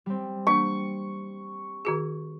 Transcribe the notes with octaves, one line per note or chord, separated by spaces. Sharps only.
G3 C4
E3 A#3 D4 C#6
D#3 F#4 G#4